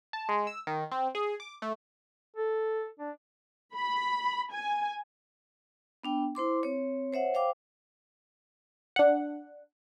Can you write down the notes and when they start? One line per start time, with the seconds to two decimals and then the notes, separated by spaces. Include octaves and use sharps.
0.13 A5
0.29 G#3
0.47 E6
0.67 D#3
0.92 C4
1.15 G#4
1.40 D6
1.62 A3
2.37 A4
2.99 D4
3.74 B5
4.51 G#5
6.04 B3 D4 G5
6.35 E4 C5 C6 D6
6.63 C4 C#5
7.13 C5 C#5 E5 F#5
7.34 C5 F5 G5 D6
8.96 D4 F#5